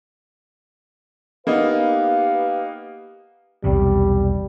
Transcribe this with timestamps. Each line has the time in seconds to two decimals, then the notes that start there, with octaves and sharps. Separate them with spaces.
1.47 A#3 B3 D#4 G4 B4 F5
3.64 B1 E2 C3 G3